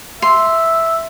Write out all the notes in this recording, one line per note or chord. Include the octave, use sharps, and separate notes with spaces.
E5 C6